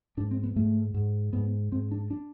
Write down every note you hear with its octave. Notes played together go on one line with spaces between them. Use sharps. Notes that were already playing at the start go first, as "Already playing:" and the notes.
G#2 D4
C4
B3
G#2 A3
G#2
G#2 B3
G#2 C4
D4
D4